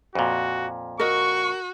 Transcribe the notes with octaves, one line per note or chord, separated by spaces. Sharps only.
F2 A#2 F#4
F#4 A#4 D#5 C#6